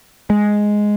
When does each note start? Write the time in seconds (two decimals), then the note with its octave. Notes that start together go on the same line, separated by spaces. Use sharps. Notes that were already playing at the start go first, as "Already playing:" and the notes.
0.30 G#3